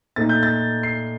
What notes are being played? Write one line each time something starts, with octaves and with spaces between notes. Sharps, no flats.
A#2 A3 D#4 A6
G6
A6
C7